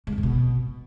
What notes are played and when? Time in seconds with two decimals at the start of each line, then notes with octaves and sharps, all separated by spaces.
0.07 G#2
0.12 D3
0.18 G#2
0.23 B2